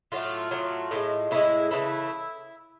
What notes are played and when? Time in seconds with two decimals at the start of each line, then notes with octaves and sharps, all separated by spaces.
0.12 A2 F#3 A3 F4
0.51 A2 F#3 A3
0.91 A2 E3 G#3
1.31 A2 E3 G#3 E4
1.71 C#3 E3 A3 E4